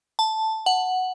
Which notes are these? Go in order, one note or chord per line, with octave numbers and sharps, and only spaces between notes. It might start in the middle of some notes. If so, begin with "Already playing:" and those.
A5
F#5